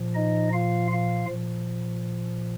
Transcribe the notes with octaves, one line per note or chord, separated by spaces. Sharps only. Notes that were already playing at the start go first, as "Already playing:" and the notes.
Already playing: A#2 F3
D#4 D#5
F4 F5
F4 F5
A#2 F3